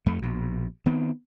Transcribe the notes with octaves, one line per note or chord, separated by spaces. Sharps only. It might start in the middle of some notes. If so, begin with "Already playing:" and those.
F2 A3
A#1 B2
D#3 B3 C4